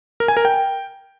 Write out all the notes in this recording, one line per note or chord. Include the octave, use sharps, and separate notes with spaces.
A#4
G#5
A#4
G5